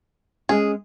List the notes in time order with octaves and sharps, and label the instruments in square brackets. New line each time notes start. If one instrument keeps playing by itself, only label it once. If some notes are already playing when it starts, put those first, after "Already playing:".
[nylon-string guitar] G#3 C#4 [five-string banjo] G#4